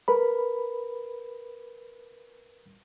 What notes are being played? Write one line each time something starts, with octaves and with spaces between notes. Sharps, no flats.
A#4 B4 B5